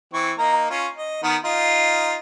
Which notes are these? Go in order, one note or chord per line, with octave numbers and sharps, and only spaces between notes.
E3 C4 C#6
A#3 D#4 A#5
C#4 F4
D#5
D#3 B3 A#4
D#4 F4